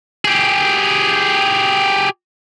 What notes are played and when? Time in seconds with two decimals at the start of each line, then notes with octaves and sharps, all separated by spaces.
0.25 G4 G#4